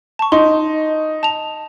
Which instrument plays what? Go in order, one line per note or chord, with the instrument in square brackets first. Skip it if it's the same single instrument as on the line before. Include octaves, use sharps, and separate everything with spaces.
[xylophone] A5 C#6
[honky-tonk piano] D#4 [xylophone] C6
[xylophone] A5 F7